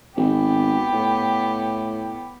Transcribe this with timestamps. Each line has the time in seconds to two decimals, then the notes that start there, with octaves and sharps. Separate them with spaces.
0.17 G#1 B3 G4
0.93 A2